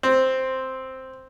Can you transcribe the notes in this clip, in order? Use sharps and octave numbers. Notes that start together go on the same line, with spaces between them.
C4